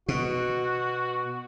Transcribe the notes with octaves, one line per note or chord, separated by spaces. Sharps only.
B2 F#4